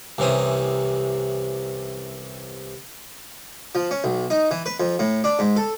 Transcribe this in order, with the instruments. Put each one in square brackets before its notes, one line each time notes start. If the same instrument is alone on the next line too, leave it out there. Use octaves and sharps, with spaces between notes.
[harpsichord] C2 C3 E3 C#4 C5 D#6
F3
C#4
B1
D#4
E3
B4
F2
A2
D4
G#2
A4